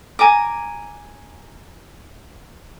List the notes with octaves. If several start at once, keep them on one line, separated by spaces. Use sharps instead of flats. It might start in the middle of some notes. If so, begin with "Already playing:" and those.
G#5 A#5 D6